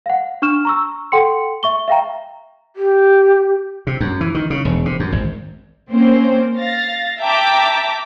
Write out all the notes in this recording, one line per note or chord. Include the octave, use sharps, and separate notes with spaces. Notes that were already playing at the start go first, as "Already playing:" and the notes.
F5 F#5
D4 C#6 F6 E7
A#5 C#6 E6
A4 F#5 G5 C6 C#7
E5 C#6 G7
E5 F5 G5 A#5
G4
C3
F#2
E3
D#3
C#3
E1
C3
F#2
G#1
A#3 C4 C#4 C5
F5 A6 A#6
E5 G5 A5 A#5 D6 B6